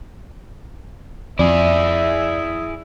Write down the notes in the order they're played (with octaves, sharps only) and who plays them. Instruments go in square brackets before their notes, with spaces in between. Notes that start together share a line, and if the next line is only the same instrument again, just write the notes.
[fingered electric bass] F2 [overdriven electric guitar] E4 G#4 [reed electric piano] D5 [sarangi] E5